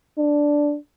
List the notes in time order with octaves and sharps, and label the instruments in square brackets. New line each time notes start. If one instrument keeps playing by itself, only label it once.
[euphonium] D4